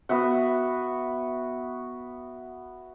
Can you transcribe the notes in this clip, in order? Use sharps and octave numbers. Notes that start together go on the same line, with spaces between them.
B3 F#4 E5 F#5